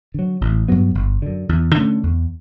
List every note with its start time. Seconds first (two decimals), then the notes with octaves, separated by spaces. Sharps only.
0.14 D3 F#3
0.41 A1
0.68 G2 F#3 B3
0.95 G1
1.22 F#2 D3
1.49 E2
1.76 D3 A3 C#4
2.03 E2